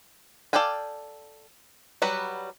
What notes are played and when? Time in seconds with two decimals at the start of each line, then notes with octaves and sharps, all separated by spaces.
0.53 A4 D5 F5 G5 G#5
2.02 F#3 G3 F#4 B4